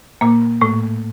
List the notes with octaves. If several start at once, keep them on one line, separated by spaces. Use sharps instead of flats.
A#2 A#3
A2 A3